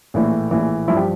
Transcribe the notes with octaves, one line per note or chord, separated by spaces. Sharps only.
A#1 A2 E3
A#1 A2 E3
G2 F3 E4
G4